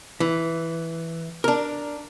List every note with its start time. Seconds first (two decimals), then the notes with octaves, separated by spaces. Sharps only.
0.20 E3
1.44 D4 A#4